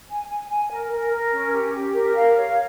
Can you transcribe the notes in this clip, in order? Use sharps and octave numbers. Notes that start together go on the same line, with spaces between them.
G#5
G#5
G#5
A#4
A#4
A#4
C#4
G4
G4
A#4
F5
C#5